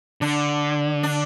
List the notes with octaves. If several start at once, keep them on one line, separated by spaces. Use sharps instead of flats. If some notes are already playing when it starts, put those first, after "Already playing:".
D3 D4
D4